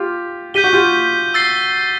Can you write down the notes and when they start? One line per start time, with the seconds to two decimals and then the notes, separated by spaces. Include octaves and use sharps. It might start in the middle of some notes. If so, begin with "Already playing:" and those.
Already playing: F4 G4
0.54 G4 G6 B6 D#7 G7
0.64 F#4
0.73 F4 G4
1.34 E6 A6 C7